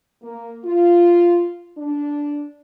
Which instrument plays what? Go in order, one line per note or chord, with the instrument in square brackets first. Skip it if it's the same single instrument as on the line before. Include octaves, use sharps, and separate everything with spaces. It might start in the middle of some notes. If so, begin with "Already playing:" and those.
[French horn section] A#3
F4
D4